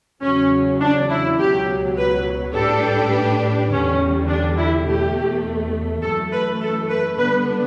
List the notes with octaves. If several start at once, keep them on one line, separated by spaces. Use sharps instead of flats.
E2 C#3 F#3 C#4
D4
E4
C#2 B2 F#3 G4
B4
A2 G3 D4 G4 A4 B4
E2 D3 G3 C#4
D4
E4
E2 B2 A3 G4
F#2 E3 A3 A4
B4
A4
B4
D3 G3 B3 D4 B4